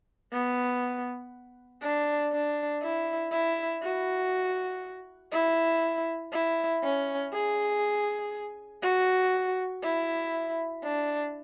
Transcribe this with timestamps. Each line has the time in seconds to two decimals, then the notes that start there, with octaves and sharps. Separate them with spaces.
0.32 B3
1.82 D4
2.32 D4
2.83 E4
3.32 E4
3.83 F#4
5.33 E4
6.33 E4
6.83 C#4
7.33 G#4
8.83 F#4
9.83 E4
10.83 D4